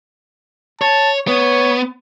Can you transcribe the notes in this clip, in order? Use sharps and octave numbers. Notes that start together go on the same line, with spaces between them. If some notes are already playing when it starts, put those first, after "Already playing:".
C#5 A5
B3 C#5